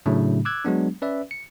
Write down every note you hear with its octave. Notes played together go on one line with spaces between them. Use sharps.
A2 C#3 F#3 A3 D4
D6 E6 F#6 G#6
F#3 G#3 B3 D4
C#4 B4 D5 E5
C#7